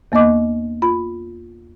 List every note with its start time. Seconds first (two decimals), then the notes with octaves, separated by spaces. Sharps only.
0.12 E2 A#3 B3 D#5 D6
0.82 F4 B5